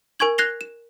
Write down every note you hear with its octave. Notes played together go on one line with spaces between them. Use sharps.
A#4 G#5 C#6 G#6 F#7
F#6 G#6 A#6 C7 F7 G7
E7